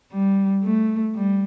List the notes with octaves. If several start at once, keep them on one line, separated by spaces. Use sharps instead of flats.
G3
A3
G3